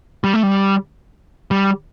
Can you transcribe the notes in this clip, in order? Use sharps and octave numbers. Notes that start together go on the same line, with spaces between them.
G3
A3
G3
G3